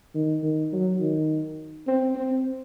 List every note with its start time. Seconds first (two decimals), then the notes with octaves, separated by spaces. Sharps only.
0.14 D#3
0.43 D#3
0.73 F#3
1.00 D#3
1.87 C4
2.15 C4